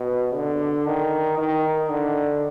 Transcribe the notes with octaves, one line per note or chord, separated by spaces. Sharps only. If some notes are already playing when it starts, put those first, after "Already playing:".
Already playing: B2
D3
D#3
D#3
D3